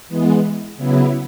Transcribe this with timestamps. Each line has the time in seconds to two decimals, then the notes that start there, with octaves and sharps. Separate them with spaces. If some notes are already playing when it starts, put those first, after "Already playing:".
0.09 E3 G#3 B3
0.77 C#3 F#3 B3 E4